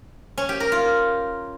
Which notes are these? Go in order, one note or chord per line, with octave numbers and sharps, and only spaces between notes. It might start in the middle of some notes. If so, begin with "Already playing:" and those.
C#4
G4
A#4
F4